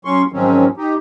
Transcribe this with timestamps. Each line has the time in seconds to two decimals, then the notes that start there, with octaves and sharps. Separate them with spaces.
0.05 F#3 C#4 C6 C#6
0.32 G#2 D#3 F3 F#3 C4 C#4
0.77 D#4 G4